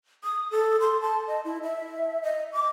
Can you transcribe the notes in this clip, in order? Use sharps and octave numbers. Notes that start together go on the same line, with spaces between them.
D#6
A4
C6
A5
D#5
E4
E5
D#5
D6